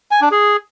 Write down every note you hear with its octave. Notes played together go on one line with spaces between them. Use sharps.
G#5
D4
G#4